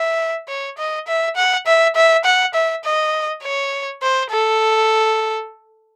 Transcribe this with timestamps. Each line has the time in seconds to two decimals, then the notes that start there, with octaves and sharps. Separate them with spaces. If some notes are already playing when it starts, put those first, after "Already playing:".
Already playing: E5
0.48 C#5
0.78 D#5
1.08 E5
1.36 F#5
1.67 E5
1.96 E5
2.25 F#5
2.54 E5
2.84 D#5
3.43 C#5
4.02 C5
4.31 A4